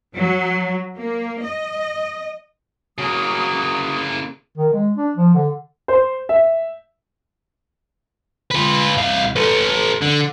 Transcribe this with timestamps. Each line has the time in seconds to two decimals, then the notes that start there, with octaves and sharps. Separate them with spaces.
0.16 F#3
0.97 A#3
1.42 D#5
2.98 C#3 F#3 A#3 F#4 D#6
4.58 D#3
4.73 G#3
4.97 D4
5.17 F3
5.34 D3
5.88 C5
6.29 E5
8.51 F4 B4
8.97 C2 F5
9.36 A4 B4
10.01 D3